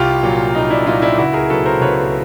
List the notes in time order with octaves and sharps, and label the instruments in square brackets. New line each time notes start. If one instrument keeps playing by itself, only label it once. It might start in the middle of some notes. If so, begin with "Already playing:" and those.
Already playing: [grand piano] C2 F4 G4
A#2 F#3
C2 D#4
D4 E4
A#2 F#3 D#4 F4
D4 E4
C#2 E4 F#4
G#4 A#4
B2 F#3 A4 B4
A#4 C5
C#2 B4 C#5